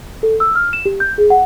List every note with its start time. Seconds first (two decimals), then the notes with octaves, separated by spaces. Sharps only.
0.23 A4
0.40 E6
0.56 F6
0.73 E7
0.85 G4
1.00 G6
1.18 G#4
1.30 F#5